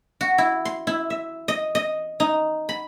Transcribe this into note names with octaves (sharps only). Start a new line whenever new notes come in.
F#4
E4
C6
E4
E5
D#5
D#5
D#4
B5